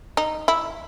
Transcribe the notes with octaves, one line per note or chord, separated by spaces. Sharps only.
D#4
E4